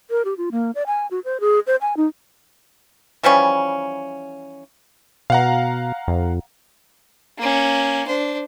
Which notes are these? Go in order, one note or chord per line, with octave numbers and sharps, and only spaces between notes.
A#4
G4
F4
A#3
D5
G#5
F#4
C5
G#4
C5
G#5
D#4
E3 F3 G3 C#4
B2 F5 F#5 A#5
F2
A#3 C#4
D4 C5